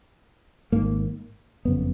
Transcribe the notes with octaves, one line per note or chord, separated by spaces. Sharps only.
G#1 G#2 A#3
F#1 F2 C#3 B3